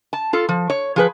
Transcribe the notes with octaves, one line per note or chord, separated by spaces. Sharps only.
A5
F4 A4
F3
C#5
F3 G#4 B4